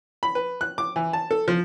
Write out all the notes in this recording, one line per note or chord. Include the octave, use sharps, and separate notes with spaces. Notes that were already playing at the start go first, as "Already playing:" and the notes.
B5
B4
F#6
D6
E3
A5
A4
F3